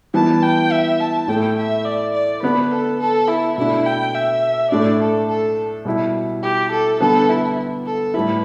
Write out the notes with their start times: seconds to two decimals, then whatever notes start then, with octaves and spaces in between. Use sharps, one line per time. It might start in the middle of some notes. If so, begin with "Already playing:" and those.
0.14 E3 G3 B3 E4 A5
0.43 G5
0.71 E5
1.00 A5
1.28 A2 A3 E4 G5
1.57 E5
1.85 D5
2.14 D5
2.42 D3 B3 D4 B4
2.71 A4
3.00 A4
3.28 E4
3.58 B2 A3 D4 E4
3.86 G5
4.14 E5
4.71 A2 A3 D4 D5
5.00 A4
5.29 A4
5.85 B2 G3 E4
6.43 G4
6.71 A4
7.00 D3 G3 B3 A4
7.29 E4
7.86 A4
8.14 A2 G3 E4 B4